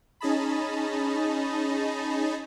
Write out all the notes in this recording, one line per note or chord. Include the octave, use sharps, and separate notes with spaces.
C#4 D#4 G#4 D#5 A5 B5